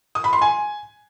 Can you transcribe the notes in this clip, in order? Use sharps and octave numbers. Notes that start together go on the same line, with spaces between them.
D#6
B5
C6
G#5